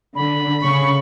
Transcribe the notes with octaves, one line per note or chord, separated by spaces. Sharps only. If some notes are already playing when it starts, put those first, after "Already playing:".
D3 B5
C#3 C#6